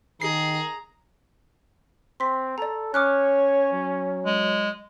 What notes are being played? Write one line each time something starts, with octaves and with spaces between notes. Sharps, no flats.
D#3 G#4 A#5 C7
C4 C6 B6
A4 D5 A#5
C#4 C#5 D6 F6 F#6
F#3
G#3